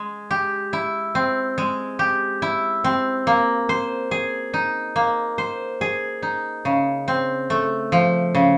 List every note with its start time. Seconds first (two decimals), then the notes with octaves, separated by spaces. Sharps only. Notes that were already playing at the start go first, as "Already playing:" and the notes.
Already playing: G#3
0.31 G4
0.73 E4
1.15 C4
1.58 G#3
1.99 G4
2.42 E4
2.84 C4
3.27 A#3
3.69 C5
4.11 G#4
4.54 D#4
4.96 A#3
5.38 C5
5.81 G#4
6.22 D#4
6.65 C#3
7.08 C4
7.50 A3
7.92 F3
8.35 C#3